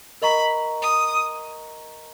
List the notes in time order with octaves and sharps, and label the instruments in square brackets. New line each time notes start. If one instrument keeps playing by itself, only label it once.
[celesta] A#4 D#5 A#5 C#6 [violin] B5
[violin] D#6